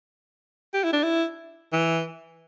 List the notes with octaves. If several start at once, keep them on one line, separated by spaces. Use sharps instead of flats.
G4
E4
D4
E4
E3